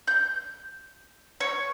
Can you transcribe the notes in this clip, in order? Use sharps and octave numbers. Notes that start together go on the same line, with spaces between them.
G6
C#5